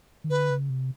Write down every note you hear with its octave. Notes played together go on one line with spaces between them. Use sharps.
D#3
D3 B4
C#3
C3